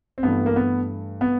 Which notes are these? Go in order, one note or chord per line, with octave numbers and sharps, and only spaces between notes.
C4
G2 E3 A3 B3
A#3
B3
B3